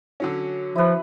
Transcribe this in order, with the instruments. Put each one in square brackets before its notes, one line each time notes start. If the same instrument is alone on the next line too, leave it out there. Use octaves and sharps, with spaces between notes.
[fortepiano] D3 F#3 C#4
[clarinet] F3 [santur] E4 B4